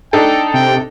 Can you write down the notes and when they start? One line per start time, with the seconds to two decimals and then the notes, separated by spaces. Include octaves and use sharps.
0.13 D4 D#4 A4 G5
0.54 C3 G5